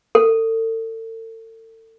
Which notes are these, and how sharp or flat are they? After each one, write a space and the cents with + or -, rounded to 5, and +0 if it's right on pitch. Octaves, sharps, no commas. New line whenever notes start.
A4 +35